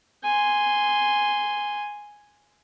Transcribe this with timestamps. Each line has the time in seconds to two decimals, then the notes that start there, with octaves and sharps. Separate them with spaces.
0.23 G#5 C6